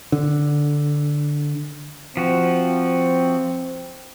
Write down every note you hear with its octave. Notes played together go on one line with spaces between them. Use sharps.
D3
F3 C4 F#4